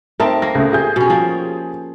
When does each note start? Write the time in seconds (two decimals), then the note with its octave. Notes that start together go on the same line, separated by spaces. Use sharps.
0.20 A3 C4 D#4 A#4 E5 A5
0.42 A#3 A#6
0.55 C#2 A3
0.72 G4 G#4 G6
0.96 B2 C#4
1.10 F3 A#3